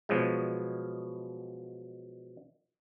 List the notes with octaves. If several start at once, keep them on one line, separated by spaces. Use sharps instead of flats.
B2 F3 F#3 G#3